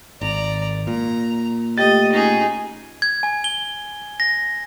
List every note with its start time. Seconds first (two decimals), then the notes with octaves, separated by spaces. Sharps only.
0.21 G#1 D5 A#5
0.87 A#2 A#5
1.78 A3 G4 D#5 G5 A6
2.12 C#4 D#4 F4 G#4 A#6
3.02 G#6
3.23 G#5
3.44 G7
4.20 A#6